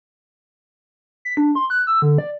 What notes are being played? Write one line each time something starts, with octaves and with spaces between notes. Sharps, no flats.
B6
D4
C6
F#6
E6
D3
D5